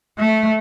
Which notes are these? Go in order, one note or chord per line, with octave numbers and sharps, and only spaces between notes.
A3